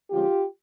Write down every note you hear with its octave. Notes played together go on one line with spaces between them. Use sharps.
D3 F3 G#3 C#4 F4 G4